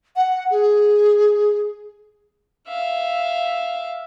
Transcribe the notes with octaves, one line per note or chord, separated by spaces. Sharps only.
F#5
G#4
E5 F5